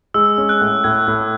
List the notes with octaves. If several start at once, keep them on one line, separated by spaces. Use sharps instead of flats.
G#3 E6
C#4
F#6
A2
A2 G#6
A2